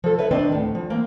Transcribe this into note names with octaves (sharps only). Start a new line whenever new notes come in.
F3 A4
B4 C#5 E5
D#3 C4 D4 B4 D#5
D2 A2
F3
E3 A#3 C4